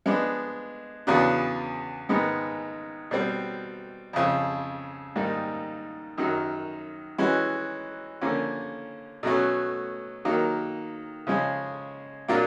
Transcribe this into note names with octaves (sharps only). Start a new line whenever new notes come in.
F3 G#3 B3 D4
E2 C#3 F#3 B3 D4
G#2 D#3 G#3 B3
B2 G3 C4
F2 C#3 F3
G#2 D#3 G3 A#3 D#4
F#2 D#3 F#3
E3 G#3 C#4 F#4
D3 F3 A#3 C#4
B2 F#3 A3 C#4
D#3 F#3 A#3
C#3 F3 G#3 C#4
A#2 F#3 A#3 D4 F4